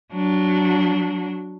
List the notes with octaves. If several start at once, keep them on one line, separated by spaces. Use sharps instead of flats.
F#3 D4